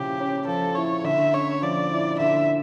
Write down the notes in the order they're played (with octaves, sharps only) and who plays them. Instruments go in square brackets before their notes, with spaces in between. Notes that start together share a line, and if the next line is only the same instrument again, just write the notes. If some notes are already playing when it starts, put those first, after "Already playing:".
Already playing: [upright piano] C#3 F3 E4 [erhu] G4
[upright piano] C#4
[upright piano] F3 [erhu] A4
[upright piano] E4 [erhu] C#5
[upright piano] D3 [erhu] E5
[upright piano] C#4 [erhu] C#5
[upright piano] F3 [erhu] D5
[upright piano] E4
[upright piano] D3 [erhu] E5